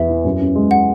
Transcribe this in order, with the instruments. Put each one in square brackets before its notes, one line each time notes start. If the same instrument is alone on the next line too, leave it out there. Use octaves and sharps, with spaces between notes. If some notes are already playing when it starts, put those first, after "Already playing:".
Already playing: [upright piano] E2 B3 [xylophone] E5
[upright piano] E3
F#2
C#4
G#3
[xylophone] F#5